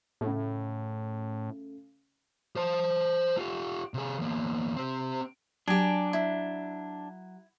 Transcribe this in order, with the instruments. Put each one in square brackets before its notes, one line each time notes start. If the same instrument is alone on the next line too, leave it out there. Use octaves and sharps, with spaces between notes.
[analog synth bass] A2 [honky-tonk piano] C#3 A3
[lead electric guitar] C5 A5
F4 G4
C3 G#4
E2 A#3
C4 G4
[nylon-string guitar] F#3 [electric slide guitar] D4 [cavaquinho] G4 G#5
[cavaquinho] E4